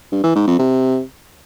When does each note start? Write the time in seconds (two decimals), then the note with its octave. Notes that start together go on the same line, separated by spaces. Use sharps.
0.12 G2
0.24 E3
0.35 G#2
0.47 F2
0.59 C3